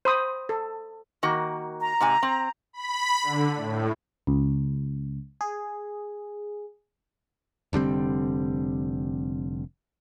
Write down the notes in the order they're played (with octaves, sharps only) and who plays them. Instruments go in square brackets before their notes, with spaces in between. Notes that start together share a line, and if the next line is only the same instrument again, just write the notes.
[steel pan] C5 B5 D#6
A4
[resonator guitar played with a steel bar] D#3 A#3 F#4
[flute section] A#5
[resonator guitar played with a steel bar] G#2 C3 G#5
C4
[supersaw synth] B5
D3
A2
[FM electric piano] C#2
G#4
[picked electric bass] F1 D3 G3 C4